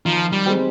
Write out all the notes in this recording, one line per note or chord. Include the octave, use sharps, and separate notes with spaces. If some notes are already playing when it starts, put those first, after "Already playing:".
D#3 F3
G3
G#3 C4 G4